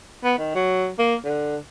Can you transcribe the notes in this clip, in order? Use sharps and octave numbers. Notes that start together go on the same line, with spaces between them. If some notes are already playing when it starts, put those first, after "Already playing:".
B3
D#3
F#3
A#3
D3